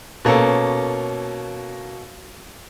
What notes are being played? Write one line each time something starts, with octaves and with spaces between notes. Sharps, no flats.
B2 A#3 C#4 A4